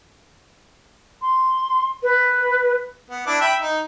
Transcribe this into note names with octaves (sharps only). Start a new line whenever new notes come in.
C6
B4
B3
D4 E4 D6
E5 G5 B5
D#4